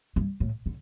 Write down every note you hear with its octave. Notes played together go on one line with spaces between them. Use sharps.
G2
A2
D3